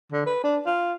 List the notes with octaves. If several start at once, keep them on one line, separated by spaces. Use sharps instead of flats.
D3
B4
D4
F4